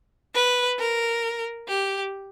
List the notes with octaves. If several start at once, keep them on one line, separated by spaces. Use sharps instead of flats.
B4
A#4
G4